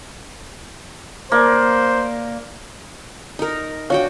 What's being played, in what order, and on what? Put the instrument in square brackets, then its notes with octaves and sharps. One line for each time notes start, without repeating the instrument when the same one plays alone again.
[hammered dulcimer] A#3 D5 [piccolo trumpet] C5
[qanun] D#4 A#4
[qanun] D4 F#4 G5 [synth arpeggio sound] C#5 F5